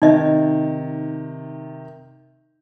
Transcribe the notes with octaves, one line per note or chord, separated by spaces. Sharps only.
C3 D#3 D#4 D#5 E5